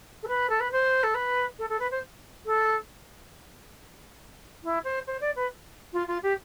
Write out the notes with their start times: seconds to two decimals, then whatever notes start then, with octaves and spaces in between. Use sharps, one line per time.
0.23 A4
0.28 B4
0.49 A4
0.60 B4
0.71 C5
1.03 A4
1.14 B4
1.59 A4
1.69 A4
1.79 B4
1.91 C5
2.45 A4
4.63 E4
4.84 C5
5.07 C5
5.21 D5
5.36 B4
5.93 F4
6.07 F4
6.23 G4